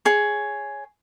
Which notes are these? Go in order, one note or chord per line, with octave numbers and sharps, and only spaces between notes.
G#4 C#5